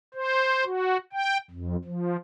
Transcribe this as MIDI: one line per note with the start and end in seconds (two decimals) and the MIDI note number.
0.14 0.64 72
0.65 0.97 66
1.13 1.37 79
1.51 1.76 41
1.85 2.17 53